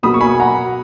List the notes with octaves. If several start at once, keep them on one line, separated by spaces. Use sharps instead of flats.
B2 F#3 A#3 B5 D#6
C#6
G#5 B5
F#5 A#5